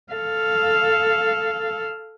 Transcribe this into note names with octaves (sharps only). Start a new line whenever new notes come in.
A4 F5